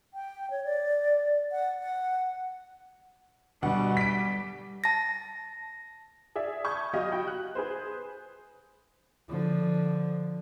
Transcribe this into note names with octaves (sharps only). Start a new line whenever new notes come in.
G5
C#5
D5
F#5
F#5
D2 B2 G3 F#5
B6 D7
A5 A#6
G#4 D5 E5
A5 B5 C#6 D#6 G6 G#6
F#3 G4 D#5 F5
F#4 G5 B5
F#6
G#4 B4 C5
D3 F3